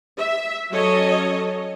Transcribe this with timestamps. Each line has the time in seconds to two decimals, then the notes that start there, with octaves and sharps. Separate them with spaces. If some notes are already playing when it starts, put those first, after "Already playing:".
0.18 E5
0.71 F#3 C#4 A4 C#5 D#5